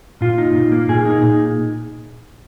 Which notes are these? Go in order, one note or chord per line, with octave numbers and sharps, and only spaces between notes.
A#2 F4
D#4
A#2
A#3
A#2 G#4
D#4
A#2